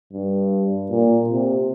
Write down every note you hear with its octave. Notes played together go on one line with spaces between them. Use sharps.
G2
A#2
C3